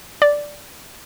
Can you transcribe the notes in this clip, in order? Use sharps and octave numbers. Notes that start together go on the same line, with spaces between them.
D5